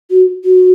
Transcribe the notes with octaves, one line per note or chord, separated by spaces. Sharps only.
F#4
F#4